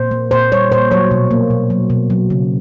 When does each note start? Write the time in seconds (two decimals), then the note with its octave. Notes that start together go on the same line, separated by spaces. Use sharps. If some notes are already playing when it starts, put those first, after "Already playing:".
Already playing: A#2 C5
0.11 A#3
0.31 A#2 C5
0.52 G3 C#5
0.71 A#2 C5
0.91 F#3 C#5
1.11 B2
1.31 A#3
1.50 B2
1.70 F#3
1.90 B2
2.10 F#3
2.30 C#3